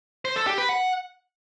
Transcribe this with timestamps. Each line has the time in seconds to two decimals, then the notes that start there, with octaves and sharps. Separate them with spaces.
0.25 C5
0.36 A4
0.47 G4
0.58 B4
0.69 F#5